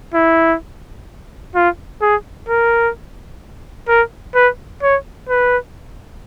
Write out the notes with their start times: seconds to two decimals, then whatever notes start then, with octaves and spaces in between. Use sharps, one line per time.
0.14 E4
1.55 F4
2.02 G#4
2.49 A#4
3.88 A#4
4.35 B4
4.83 C#5
5.29 B4